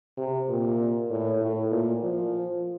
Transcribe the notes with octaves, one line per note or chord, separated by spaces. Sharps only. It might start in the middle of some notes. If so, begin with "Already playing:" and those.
C3
A#2
A2
A2
A#2
F3